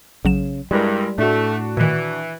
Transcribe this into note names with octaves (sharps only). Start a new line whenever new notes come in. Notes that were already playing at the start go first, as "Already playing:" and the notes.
A#1 C#3 F#3 E7
G2 G3 G#3 E4 A#4
A2 A3 D4 F#4
A#2 D#3 E3